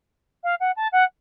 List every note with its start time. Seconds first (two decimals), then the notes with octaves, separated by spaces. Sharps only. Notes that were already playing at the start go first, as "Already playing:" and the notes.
0.43 F5
0.60 F#5
0.76 A5
0.92 F#5